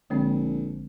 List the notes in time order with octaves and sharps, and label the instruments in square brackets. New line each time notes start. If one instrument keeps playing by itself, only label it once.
[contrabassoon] A#1 [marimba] D3 G#3 C4